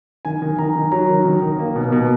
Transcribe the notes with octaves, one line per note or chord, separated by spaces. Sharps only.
D#3 G#5
D#3
D#3 A#5
D#3
F#3 A#5
D#3
D#3
D#3
A#3
B2
B2